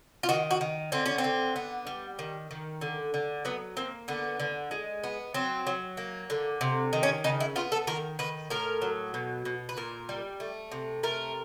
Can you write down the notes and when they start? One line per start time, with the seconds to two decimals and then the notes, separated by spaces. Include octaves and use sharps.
0.23 F4
0.29 D#3 F#4
0.51 F#4
0.61 D#3
0.92 D3 C4
1.06 C#4
1.18 C4
1.24 D3
1.56 B3
1.87 G3
2.19 D#3
2.51 D#3
2.81 D3
3.14 D3
3.45 F#3 B3
3.77 A#3 C4
4.08 D3 B3
4.40 D3
4.71 G#3
5.04 B3
5.34 F#3 C4
5.67 F#3
5.97 A#3
6.30 D3
6.61 C3
6.93 D#3
7.03 C#4
7.24 C#3 D#4
7.40 E4
7.56 B3 F4
7.72 A4
7.87 D#3 A#4
8.19 D#3 B4
8.50 A2 A#4
8.82 F#3
9.14 B2
9.45 B2
9.69 B4
9.77 A#2 A#4
10.09 G3
10.40 A3
10.72 C3
11.03 A3 A#4